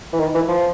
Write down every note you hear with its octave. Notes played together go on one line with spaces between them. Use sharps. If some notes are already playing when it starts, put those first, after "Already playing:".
E3
D#3
E3
F3